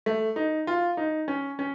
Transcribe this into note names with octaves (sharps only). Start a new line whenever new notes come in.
A3
D#4
F4
D#4
C#4
C#4